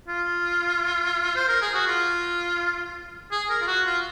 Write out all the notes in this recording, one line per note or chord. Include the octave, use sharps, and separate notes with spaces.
F4
C5
A#4
G#4
F#4
F4
G#4
A#4
F4
F#4
F4